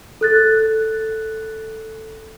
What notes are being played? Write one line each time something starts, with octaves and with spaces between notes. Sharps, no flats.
A4 F#6 A6